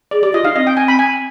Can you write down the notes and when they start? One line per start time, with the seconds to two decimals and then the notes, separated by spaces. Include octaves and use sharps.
0.11 G#4 D5
0.23 G4 D5
0.33 F4 D#5
0.45 D#4 F5
0.55 C4 D#5
0.67 G5
0.77 G#5
0.88 B5
0.99 G#5